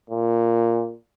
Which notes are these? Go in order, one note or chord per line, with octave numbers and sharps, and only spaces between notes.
A#2